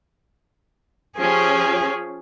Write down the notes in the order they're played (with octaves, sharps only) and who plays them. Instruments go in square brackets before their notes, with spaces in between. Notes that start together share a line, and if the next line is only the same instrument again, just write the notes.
[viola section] F3 C#4 G4 [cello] G#4